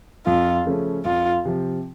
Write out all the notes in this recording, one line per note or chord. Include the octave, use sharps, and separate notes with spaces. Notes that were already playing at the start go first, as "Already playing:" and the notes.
F2 F4
C#3 F3 A3 C#4
F2 F4
C3 F3